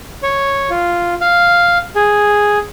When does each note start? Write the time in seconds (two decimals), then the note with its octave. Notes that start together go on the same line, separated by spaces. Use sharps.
0.23 C#5
0.70 F4
1.21 F5
1.96 G#4